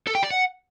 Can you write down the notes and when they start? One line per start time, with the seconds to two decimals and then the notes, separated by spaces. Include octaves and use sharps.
0.07 A4
0.15 G5
0.23 D5
0.31 F#5